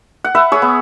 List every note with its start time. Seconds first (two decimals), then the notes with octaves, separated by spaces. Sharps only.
0.24 F#5
0.35 B4 E5
0.52 G#4 C#5
0.62 B3